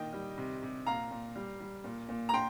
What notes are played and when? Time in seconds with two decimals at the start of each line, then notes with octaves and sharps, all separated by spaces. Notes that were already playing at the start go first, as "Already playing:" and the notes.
Already playing: A#2 D#3 D#5 G5
0.13 G3
0.38 C3
0.63 C3
0.86 A#2 F5 A#5
1.11 A#2
1.36 G3
1.60 G3
1.84 A#2
2.09 A#2
2.29 A#5
2.34 A#2 G5 C6